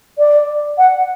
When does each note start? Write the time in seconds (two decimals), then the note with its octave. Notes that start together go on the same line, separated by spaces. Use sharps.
0.18 D5
0.78 F#5